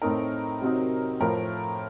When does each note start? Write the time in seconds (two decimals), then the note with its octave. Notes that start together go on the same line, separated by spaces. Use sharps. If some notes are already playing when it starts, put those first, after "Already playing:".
0.02 A2 A3 C4 D#4 A#4
0.61 C3 F#3 C4 D#4
1.20 A2 F3 A3 A#4